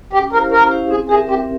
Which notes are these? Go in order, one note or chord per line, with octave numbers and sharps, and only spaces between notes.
C#4 G4
E4 G4 A#4 C5 F5
C#4 A#4
E4 G4 C5 F5
C4 G#4
G4 G#4 A#4 E5
C4 G4